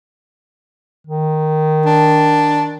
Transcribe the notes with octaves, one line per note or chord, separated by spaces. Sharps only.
D#3
D4